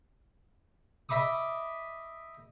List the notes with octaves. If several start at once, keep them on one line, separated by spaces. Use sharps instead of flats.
D#5 E5 B5 D6 D#6